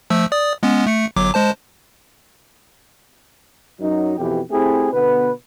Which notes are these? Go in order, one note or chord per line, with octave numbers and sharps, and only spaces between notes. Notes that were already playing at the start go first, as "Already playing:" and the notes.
F3 A3 E6
D5 D#6
G#3 B3 C#4
A3 C#7
G1 F#3 D6
G#3 C5 A5
F#2 F#3 D#4
F2 B2 E3 G4
A3 C4 E4 G4 G#4
B2 D3 B3 B4